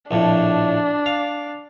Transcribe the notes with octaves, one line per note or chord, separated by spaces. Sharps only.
A#1 F2 A2 D4
F5